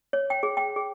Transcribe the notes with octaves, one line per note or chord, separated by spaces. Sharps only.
C#5
G5
G#4
G5
G#4